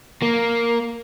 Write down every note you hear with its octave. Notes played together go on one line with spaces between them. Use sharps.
A#3